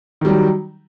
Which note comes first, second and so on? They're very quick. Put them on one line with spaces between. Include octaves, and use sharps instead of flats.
D#3 G3 F#3